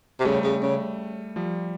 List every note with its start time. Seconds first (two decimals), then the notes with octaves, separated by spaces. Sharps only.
0.20 C3
0.25 C#3 G3 A3
0.44 C#3
0.62 C#3
1.36 F3 G3